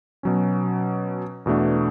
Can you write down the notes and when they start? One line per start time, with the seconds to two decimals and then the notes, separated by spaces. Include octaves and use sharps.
0.23 B2 F#3 C#4
1.46 E2 B2 A3 D4